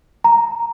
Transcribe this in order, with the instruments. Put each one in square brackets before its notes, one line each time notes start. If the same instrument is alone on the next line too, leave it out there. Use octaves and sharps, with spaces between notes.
[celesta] A#5